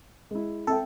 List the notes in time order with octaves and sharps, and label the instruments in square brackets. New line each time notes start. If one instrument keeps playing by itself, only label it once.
[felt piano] G#3 E4
[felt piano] C4 E5 G5 [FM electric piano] A4